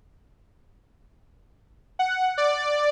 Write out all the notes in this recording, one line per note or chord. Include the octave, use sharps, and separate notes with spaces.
F#5
D5